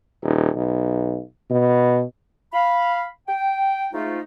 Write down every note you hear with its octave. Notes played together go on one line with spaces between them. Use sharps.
D#1
B1
B2
F5 B5
G5
G#2 A3 D#4 F4